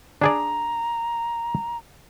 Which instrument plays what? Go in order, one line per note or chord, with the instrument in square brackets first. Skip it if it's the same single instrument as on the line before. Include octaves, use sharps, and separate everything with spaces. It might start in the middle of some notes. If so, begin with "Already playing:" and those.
[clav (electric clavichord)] D4 G#4 D5 [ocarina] A#5